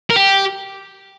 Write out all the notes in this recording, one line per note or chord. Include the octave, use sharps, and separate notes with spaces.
A#4
G4